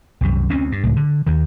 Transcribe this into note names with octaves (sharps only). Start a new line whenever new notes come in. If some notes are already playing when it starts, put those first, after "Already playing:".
C2 F#2 C3
D2 C4 C#4
G2
C#2 A2
D3
D#2 D#3